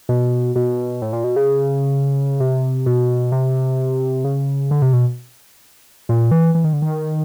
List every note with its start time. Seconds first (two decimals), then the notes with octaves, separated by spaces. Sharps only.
0.09 B2
0.56 B2
1.02 A2
1.13 A#2
1.24 B2
1.36 C#3
2.40 C3
2.86 B2
3.32 C3
4.24 C#3
4.71 D3
4.82 C3
4.93 B2
6.09 A#2
6.31 E3
6.55 E3
6.64 D#3
6.73 D3
6.82 D#3